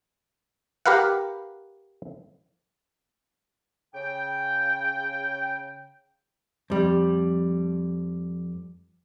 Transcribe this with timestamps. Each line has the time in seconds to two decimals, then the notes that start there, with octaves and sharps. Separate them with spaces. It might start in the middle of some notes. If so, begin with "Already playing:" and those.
0.86 G4 A#4 B4 F5 F#5
3.95 C#3 G5
6.70 F2 G3